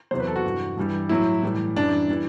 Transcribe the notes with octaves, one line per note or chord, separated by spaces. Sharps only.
E2 C3 F#3 C5
B4
A4
F#4
G2 E3 G3
G2 E3 G3
A2 F#3 E4
A2 E3 G3
F#2 E3 G3 D4
E3 G3